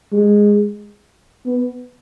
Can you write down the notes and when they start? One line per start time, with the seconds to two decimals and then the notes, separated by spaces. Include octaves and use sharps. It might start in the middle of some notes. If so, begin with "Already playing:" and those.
0.13 G#3
1.46 B3